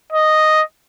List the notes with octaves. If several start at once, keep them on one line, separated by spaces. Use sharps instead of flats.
D#5